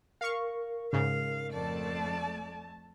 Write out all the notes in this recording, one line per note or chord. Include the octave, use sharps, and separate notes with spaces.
A#4 F5 C#6
G#2 C#3 F5
F2 A3 D5 A5